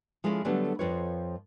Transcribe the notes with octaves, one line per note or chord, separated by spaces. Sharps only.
F3 G#3 A3 C#4 E4
D3 F#3 G3 A3 B3
F2 F3 F4 B4 C#5